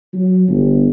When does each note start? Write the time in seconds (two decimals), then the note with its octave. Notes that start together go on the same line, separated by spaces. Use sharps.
0.13 F#3
0.47 G1